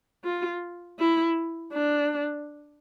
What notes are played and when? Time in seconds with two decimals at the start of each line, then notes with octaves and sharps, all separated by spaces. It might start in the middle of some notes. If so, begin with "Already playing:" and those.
0.24 F4
0.99 E4
1.73 D4